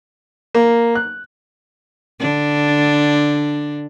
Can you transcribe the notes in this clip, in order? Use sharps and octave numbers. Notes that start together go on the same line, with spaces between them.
A#3
F#6
D3 D4